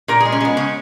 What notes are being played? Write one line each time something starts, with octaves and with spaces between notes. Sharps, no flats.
A#2 A#4
G#3 G#4
C#4
G#3 B3
C#3 C#4